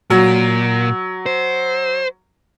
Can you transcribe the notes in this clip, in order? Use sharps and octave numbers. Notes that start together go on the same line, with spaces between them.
A#2 F#3
C5